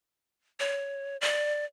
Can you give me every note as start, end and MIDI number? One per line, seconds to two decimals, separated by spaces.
0.60 1.17 73
1.21 1.65 74